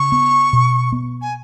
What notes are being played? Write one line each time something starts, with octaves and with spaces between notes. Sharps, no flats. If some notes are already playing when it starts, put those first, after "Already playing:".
Already playing: C#3 C#6
B3
B2
B3
G#5